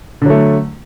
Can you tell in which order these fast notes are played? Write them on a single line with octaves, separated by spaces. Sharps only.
D3 F#3 A3